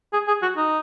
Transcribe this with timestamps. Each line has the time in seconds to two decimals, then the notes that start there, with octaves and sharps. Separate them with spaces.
0.13 G#4
0.28 G#4
0.42 F#4
0.57 D#4